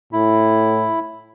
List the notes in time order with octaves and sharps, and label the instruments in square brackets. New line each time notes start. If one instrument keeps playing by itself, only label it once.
[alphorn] A2 [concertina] E4